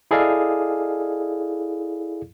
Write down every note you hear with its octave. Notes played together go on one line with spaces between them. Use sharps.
E4 G#4 A4 D5 D#5 F5